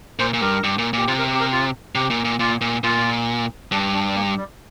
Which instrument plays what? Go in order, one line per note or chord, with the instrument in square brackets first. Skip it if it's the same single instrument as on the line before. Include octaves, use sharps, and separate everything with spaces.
[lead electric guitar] A#2 [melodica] C5
[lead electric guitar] A#2
[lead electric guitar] G2 [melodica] A#4
[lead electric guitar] G2
A#2
[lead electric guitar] A#2 [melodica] G4
[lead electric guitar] C3 [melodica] F4
[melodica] A#4
G4
A#4
F4
[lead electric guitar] C3 [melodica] G4
[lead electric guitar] A#2
A#2
[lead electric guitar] A#2 [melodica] F4
[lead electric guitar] A#2
[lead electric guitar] A#2 [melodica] F4
[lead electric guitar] G2 [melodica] D4
[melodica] D4
G3
A#3
G3